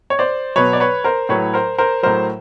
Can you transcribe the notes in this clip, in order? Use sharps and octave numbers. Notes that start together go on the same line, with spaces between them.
C#5
C5 D5
B2 F#3 B4 C#5
D5
B4 C#5
A#4 C5
A2 F#3 B4 C#5
A#4 C5
A#4 C5
A2 F#3 A#4 C5